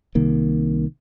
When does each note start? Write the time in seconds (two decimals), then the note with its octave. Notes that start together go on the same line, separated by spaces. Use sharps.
0.15 C2 C3 D#3 A#3